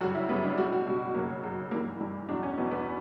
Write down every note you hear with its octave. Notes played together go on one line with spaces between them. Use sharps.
F#2 C#3 G3 F#4
E4
F#2 C#3 G3 B3
D4
B2 G3 F#4
F#4
B2 G3
F#2 C#3 F#3 A#3
F#2 C#3 F#3
G2 E3 G3 A#3
G2 E3 G3
E2 B2 F#3 D4
C#4
E2 B2 F#3 B3
B3